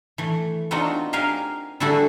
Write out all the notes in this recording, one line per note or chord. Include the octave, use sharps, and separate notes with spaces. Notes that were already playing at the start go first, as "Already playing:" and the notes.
E3 A3
B3 C4 D4 D#4 F4 F#4
G4 A#4 F5 G#5
D3 G3 E4 F#4 G#4 A4